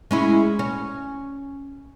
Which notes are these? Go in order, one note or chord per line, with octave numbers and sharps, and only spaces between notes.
G#3 C#4 E4
C#4